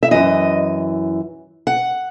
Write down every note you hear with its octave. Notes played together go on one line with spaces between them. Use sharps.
E5
F#2 E3 D#5
F#5